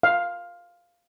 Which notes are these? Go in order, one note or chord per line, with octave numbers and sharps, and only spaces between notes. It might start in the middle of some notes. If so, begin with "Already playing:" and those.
F5